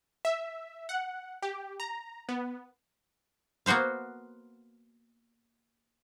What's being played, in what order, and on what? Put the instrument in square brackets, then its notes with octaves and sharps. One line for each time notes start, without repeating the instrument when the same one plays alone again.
[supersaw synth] E5
F#5
G4
A#5
B3
[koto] A#3 B3 F#4 C5 F5